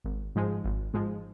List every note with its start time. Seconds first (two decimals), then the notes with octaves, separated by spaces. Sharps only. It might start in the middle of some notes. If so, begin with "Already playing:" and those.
0.04 G#1
0.35 G#2 F3 G#3
0.64 G#1
0.94 G#2 F3 G#3